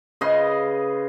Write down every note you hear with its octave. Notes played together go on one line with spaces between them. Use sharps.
C#3 B4 D#5 C6